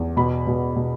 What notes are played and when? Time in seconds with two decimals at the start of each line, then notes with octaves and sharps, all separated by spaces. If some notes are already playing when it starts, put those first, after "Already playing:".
Already playing: E2
0.17 B2 B5
0.47 B2
0.76 B2